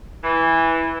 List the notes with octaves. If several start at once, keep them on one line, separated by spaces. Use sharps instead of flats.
E3